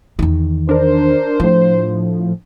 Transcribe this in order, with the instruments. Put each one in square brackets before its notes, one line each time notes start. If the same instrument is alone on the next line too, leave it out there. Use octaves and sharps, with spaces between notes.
[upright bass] E2 D#3
[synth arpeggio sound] D4 A#4 [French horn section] C5
[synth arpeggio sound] A2 F3 [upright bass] D4